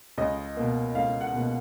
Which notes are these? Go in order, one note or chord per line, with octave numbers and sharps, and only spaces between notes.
C#2 D#5
B2 A#3
C#2 F5
F#5
B2 A#3